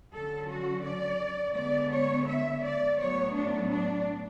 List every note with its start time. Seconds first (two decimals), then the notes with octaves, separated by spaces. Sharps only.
0.13 D3 F#3 C#4 A4
0.49 F#4
0.84 D5
1.56 D3 G#3 B3 D5
1.92 C#5
2.27 E5
2.64 D5
2.98 A2 F#3 B3 C#5
3.35 D4
3.70 D4